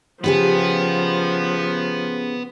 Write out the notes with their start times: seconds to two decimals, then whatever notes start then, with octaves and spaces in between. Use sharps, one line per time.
0.24 C#3 F3 B3 G4 B4